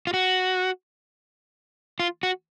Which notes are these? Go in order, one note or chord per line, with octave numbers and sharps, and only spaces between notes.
F4
F#4
F4
F#4